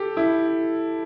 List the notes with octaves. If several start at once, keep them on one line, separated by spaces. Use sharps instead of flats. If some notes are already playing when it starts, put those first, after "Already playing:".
Already playing: G4 A4
E4